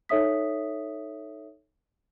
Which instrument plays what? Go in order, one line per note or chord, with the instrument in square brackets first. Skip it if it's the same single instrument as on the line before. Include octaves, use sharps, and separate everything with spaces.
[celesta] D#4 A4 C#5 E5 D#6 B6